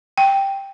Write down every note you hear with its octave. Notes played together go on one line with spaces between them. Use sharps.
G5